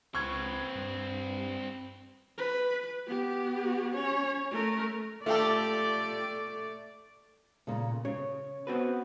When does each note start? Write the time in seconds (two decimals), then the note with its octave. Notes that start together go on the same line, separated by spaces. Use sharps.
0.15 C#2 C4 B4 C#6 G#6
0.75 G2
2.38 B4
3.07 B3 G4
3.95 C#4 C#5
4.51 A3 A#4
5.26 A3 F4 G4 A4 D5
7.67 A#2 C#3
8.05 C#3 C#5
8.67 B3 C4 F#4 B4